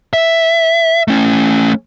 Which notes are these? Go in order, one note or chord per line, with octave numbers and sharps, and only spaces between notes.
E5
A3 C#4